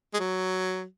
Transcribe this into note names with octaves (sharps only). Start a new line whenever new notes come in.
G#3
F#3